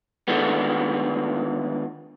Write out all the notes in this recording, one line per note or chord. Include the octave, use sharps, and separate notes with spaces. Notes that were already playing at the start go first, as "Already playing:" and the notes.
D3 D#3 F3 G#3 A3 B3